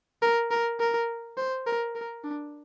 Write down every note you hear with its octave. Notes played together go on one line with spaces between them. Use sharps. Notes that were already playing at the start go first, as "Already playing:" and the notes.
A#4
A#4
A#4
C5
A#4
A#4
D4